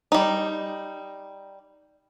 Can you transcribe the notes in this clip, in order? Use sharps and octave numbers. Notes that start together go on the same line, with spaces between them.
G3 D#4